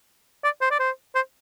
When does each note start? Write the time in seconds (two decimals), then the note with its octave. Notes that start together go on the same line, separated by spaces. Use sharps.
0.44 D5
0.61 C5
0.71 D5
0.79 C5
1.15 C5